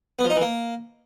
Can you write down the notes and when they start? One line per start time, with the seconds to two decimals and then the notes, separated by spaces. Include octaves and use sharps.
0.19 B3
0.24 F3
0.30 D#4
0.36 E3
0.41 A#3